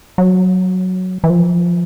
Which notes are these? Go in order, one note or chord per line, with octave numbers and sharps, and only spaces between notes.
F#3
E3
F3